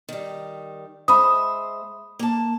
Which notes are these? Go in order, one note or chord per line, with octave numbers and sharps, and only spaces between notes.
D#3 G3
G#3 C5 E5 B5 D#6
A#3 A5